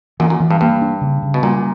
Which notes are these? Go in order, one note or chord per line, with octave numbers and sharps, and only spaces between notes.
F#2 A#2 E3
F#2 A#2
E3
G2
G2 A#3
D4
C#3
C#3
B2
F#2 A#2 G3